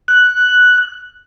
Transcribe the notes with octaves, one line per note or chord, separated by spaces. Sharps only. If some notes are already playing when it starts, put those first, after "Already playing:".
F#6